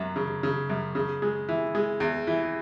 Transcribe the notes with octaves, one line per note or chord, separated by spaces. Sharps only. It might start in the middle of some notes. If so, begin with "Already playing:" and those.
Already playing: F#2 F#3
C#3
C#3
F#2
C#3
G#3
E3
G#3
E2
E3